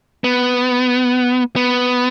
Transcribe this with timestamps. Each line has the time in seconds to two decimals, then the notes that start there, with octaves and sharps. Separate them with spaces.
0.24 B3
1.56 B3